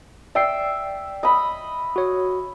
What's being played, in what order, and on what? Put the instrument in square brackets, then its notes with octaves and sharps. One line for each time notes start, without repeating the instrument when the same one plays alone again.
[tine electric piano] D5 G5 C7 [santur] E5
[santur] D#5 B5
[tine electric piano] F#4 C#5